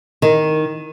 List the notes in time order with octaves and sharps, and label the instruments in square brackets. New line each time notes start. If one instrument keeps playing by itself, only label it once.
[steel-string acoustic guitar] D#3